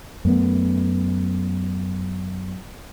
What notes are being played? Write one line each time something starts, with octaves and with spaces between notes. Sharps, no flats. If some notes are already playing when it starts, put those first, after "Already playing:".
F#2 A3 B3